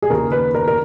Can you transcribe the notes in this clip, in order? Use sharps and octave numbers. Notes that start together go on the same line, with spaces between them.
G#4
D#2 C#3 A#4
B4
A#4
A#4